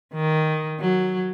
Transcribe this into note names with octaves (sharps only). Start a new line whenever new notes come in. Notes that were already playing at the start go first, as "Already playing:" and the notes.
D#3
F#3